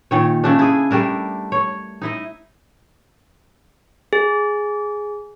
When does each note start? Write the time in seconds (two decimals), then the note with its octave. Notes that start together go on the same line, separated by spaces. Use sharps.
0.11 A#2 D#3 C#5
0.44 C#3 A3 D4
0.59 E4 G#4
0.91 G3 A3 D4 A#4
1.52 C#5
2.02 D#4 E4 D#5
4.13 G#4